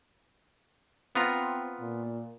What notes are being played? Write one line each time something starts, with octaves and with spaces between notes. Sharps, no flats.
B3 C4 F4 A#5
A#2